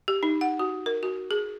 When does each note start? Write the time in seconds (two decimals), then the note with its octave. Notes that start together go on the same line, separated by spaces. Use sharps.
0.08 G4
0.23 D#4
0.41 F#5
0.59 F#4
0.86 A#4
1.03 F#4
1.31 G#4